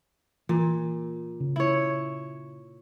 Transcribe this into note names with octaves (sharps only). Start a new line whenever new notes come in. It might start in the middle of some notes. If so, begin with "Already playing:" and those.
A#2 E3
C#3
E4 C#5